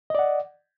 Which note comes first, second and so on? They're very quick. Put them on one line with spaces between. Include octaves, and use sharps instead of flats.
D#5 D5 F#5